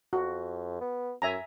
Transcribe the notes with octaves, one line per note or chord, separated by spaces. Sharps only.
F2 F#4
B3
F#2 E5 G#5 A#5